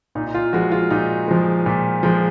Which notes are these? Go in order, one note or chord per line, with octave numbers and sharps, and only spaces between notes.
A#2 D#4
D#4
F4
F3 G#3 F#4
F4
A#2 D#4
F3 G#3
A#2
F3 G#3